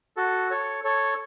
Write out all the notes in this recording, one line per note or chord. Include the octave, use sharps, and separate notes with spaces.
F#4 A4
A4 C#5
A4 C#5